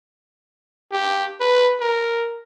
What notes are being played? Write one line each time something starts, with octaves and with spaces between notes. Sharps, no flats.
G4
B4
A#4